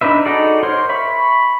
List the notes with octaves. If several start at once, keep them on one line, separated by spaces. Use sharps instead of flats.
D4 D#4 B4 E5
D#4 F#4 G#4 A4 D5
A#4 C5 C#5 C6
E5 B5 C#6